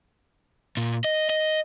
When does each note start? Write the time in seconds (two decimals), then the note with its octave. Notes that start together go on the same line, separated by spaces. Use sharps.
0.77 A#2
1.04 D#5
1.29 D#5